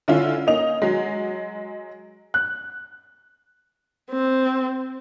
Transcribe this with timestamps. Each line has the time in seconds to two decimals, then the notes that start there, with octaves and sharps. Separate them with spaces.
0.08 D3 C#4 E4 F4
0.47 A#3 C#4 D#4 D#5 F7
0.82 F#3 G#3
2.34 F#6
4.11 C4